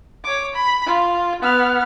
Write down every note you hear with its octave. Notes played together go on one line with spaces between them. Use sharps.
C#5 D6
B5
F4
B3 F6